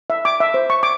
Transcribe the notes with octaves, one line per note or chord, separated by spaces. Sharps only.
E5
D6
E5
C5
C#6
D6